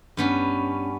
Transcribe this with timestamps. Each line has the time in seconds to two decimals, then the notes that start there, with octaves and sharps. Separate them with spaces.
0.17 G2 B3 C#4